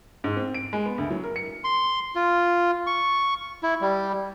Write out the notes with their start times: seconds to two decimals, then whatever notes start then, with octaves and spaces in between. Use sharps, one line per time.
0.24 G#2
0.37 C4
0.54 D7
0.73 G#3
0.86 B3
0.98 D2
1.10 F#3
1.24 A#4
1.36 C#7
1.64 C6
2.15 F4
2.87 C#6
3.63 E4
3.81 G3